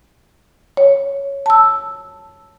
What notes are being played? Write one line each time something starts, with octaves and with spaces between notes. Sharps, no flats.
C#5
A5 E6